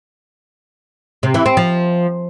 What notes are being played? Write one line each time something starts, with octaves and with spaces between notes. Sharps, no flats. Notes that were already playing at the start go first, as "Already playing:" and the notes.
C3
E3
C4
F3